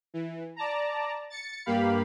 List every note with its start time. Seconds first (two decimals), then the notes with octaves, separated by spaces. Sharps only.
0.14 E3
0.56 D5 A5 A#5
1.30 A6 C#7
1.66 G2 A#3 G4 F5 B5